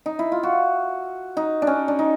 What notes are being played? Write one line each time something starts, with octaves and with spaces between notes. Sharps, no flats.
D#4
E4
F4
F#4
D#4
D4
C#4
D4
D#4